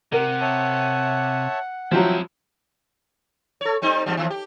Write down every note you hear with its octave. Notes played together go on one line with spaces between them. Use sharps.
C3 A#4 F#5
C#5 E5 A5
F3 F#3 C4 E4 E5 G5 E6
A4 C#5
G3 C4 D#4
E2 G#2 G3
D#2 D3 F3
G4